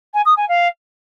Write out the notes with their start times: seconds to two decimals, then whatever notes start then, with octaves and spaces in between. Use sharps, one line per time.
0.14 G#5
0.25 D#6
0.37 G#5
0.49 F5